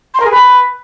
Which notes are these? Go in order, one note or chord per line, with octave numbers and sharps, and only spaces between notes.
C6
A#4
G#4
B4